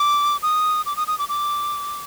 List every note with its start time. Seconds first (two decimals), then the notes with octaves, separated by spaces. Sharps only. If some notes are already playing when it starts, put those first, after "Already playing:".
Already playing: D6
0.43 D#6
0.86 D6
0.97 D#6
1.08 D#6
1.19 D6
1.29 D6